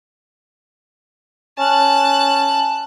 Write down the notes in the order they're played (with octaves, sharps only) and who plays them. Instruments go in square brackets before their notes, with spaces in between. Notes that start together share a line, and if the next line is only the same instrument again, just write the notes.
[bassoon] C#4 [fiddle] A5 F#6